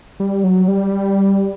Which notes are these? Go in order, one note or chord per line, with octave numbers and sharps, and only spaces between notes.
G3
F#3
G3